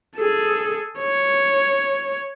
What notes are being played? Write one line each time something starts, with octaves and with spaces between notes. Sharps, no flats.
G#4 A4
C#5